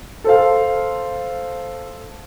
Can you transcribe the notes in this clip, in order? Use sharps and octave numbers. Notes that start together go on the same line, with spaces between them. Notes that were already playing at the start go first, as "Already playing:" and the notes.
A4 C5 F5